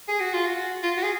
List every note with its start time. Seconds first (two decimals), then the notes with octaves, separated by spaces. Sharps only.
0.08 G#4
0.21 F#4
0.34 F4
0.46 F#4
0.83 F4
0.97 F#4
1.03 G#4